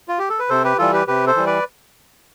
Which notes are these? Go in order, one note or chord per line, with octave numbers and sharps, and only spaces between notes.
F4
G4
A4
B4
C3 A4 C5
G4 B4
E3 G3 F4 A4
G4 B4
C3 G4 B4
A4 C5
E3 G3
B4 D5